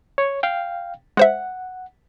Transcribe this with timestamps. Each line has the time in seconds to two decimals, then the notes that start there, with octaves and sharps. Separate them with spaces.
0.18 C#5
0.43 F5 G5
1.17 G#3 C5 E5 F#5